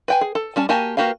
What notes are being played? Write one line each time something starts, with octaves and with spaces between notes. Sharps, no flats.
B4 G5 G#5
G#4
A4
G3 C#4 A5
A#3 F#4 G4 G#5 A5
A#3 F#4 G4 B4 F5